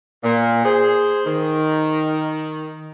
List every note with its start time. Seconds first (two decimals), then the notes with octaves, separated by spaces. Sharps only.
0.24 A#2 A#3
0.65 G#4 C5
1.26 D#3